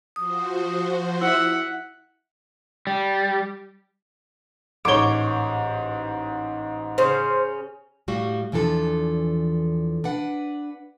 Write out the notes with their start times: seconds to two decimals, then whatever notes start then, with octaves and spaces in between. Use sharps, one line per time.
0.16 F3 F#4 C5 D#6
1.21 E4 E5 F#5
2.87 G3
4.85 A1 G#2 C#5 D6 G7
6.98 C#3 C#4 C5
8.08 A2 G3 F#4 F5
8.52 E2 E3 F3 D4 A4
10.04 D4 B4 F#5